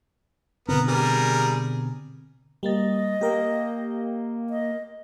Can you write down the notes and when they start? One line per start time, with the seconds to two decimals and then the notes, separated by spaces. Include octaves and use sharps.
0.68 B2 D3 B3 C4 A#4
0.88 G3 G#4 A#4
2.63 G3 A#3 D#5 A6
3.21 A#3 G4 A#4 G5
4.50 D#5